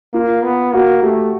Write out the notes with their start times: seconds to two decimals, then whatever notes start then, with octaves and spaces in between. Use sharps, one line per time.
0.13 A#3 F4
0.43 B3
0.73 A#3 F#4
1.02 A3 G4